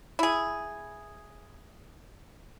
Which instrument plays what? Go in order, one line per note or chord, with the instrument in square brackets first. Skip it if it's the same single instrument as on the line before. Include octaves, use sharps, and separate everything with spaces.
[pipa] E4 G#4